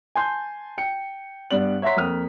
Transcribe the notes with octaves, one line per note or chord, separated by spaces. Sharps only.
G#5 A5 C6 G6
G5 C#7
G2 B3 D5 F#7
C#5 E5 F#5 A#5 C6 B6
F2 A#3 D#6 F6